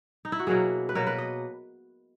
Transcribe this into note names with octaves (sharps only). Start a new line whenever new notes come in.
D#4
E4
F#4
B2 F#3 A#3 G#4
B4
B2 F#3 A#3 A#4
B4
D#5